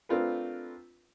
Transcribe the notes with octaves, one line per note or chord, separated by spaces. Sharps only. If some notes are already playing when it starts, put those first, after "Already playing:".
A3 C4 D4 F4 A#4 B4